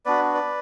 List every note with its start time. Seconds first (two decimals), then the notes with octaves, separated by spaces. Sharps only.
0.06 B3 D4 F#4 B4 D5
0.34 B4 D5